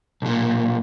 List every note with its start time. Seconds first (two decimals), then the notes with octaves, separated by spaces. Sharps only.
0.22 B1 A#2